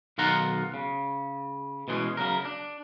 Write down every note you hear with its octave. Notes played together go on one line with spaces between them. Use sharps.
B1 D#3 F4 F#5 A#5
C#3
B2 E3 G#3 B3 C#4
C#3 F#3 A#4
D4